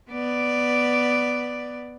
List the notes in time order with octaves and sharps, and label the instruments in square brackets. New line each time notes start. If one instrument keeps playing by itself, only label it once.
[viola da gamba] B3 D5